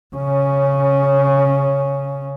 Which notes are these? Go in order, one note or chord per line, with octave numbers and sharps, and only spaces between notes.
C#3 C#4